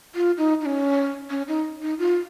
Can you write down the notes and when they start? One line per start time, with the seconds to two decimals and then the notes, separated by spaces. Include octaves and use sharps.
0.15 F4
0.38 D#4
0.61 D#4
0.66 C#4
1.30 C#4
1.48 D#4
1.82 D#4
1.99 F4